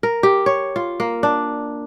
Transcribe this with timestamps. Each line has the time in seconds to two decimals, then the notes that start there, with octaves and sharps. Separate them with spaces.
0.03 A#4
0.23 G4
0.46 C#5
0.76 F4
1.00 A#3
1.23 D4